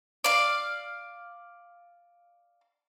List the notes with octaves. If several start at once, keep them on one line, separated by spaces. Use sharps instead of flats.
D5 F5